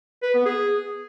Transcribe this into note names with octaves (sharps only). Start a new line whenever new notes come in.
B4
B3
G#4